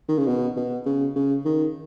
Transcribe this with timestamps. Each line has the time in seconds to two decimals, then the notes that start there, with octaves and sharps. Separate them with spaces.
0.09 D#3
0.18 C#3
0.27 B2
0.57 B2
0.86 C#3
1.16 C#3
1.45 D#3